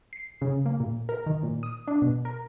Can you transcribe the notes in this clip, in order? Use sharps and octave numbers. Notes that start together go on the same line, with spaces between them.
C7
C#3
A#3
A#2
A#4
D#3
A#2
D#6
D4
B2
A#4